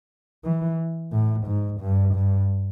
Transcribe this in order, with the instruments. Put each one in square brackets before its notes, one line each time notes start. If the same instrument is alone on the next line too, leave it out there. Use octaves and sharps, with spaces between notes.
[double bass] E3
A2
G#2
G2
G2